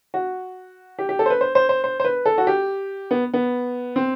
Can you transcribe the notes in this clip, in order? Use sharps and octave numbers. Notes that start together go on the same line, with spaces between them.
F#4
G4
G4
A4
C5
B4
C5
C5
C5
C5
C5
B4
A4
F#4
G4
B3
B3
C4